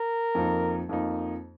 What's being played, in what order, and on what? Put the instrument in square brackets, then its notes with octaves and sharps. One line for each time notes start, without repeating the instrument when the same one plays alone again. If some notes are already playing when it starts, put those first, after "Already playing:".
Already playing: [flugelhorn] A#4
[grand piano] F2 F3 A#3 D#4
F2 F3 A#3 D#4